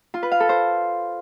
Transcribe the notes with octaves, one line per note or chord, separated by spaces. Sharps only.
F4
B4
F5
A4
C5